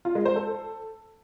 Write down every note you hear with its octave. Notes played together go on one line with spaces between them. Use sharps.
F4
G#3
C5
A4